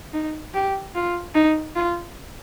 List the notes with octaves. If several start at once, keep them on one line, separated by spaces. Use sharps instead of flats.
D#4
G4
F4
D#4
F4